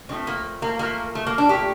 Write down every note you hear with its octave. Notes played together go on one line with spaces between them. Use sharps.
D3 F3 A3 C4
A#3
A#3
A#2 A3 A#3
A3
A#3
D4
A#2 A3 G4